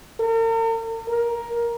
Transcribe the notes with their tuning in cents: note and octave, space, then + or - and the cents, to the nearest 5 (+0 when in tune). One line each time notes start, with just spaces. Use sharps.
A#4 -45
A#4 +10